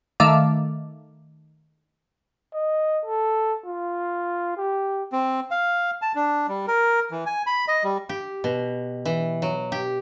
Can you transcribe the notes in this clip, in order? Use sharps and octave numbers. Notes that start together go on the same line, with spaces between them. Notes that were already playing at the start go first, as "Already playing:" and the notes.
D#3 A3 E5 F5 D6 A6
D#5
A4
F4
G4
C4
F5
A5
D4
G3
A#4
E3
G#5
B5
D#5
G3
G4
B2
E3
F#3
G4